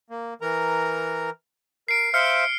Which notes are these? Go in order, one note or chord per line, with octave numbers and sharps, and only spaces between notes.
A#3
E3 A#4 A#5
A#4 C7 D7
C5 E5 F5 F6 C#7